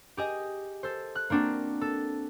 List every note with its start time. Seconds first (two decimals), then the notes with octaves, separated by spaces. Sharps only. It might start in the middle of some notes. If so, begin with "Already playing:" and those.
0.17 G4 G#4 D#5
0.83 A4 C5
1.15 F#6
1.30 A#3 C4 D4 F#4
1.81 A4